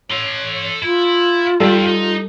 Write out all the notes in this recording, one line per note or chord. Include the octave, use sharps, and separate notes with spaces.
A4 C#5 C6
E4 F4
D#3 G3 G4 A4
D#4